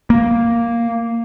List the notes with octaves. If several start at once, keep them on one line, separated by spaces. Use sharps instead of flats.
A#3